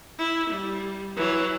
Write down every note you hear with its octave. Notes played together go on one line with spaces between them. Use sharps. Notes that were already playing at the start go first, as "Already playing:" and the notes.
E4
G3
E3 F#3